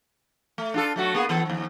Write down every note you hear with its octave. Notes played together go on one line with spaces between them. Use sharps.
A3
D4 F4 A4
F#3 A3 F#4
A#3 B3 G#4
E3 B3 A4
D#2 F3